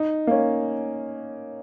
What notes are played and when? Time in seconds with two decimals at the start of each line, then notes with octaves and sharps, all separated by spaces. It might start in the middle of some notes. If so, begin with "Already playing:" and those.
Already playing: D#4
0.27 A#3
0.31 C#4